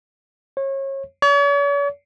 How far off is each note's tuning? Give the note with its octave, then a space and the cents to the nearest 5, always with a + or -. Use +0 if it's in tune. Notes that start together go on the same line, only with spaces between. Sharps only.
C#5 -30
C#5 +45